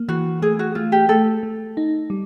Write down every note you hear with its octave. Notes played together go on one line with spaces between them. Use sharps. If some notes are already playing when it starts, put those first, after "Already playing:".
Already playing: A#3
E3 F#4
A3 G#4
F#4
A3 F4
G4
A3 A4
A3
D#4
G3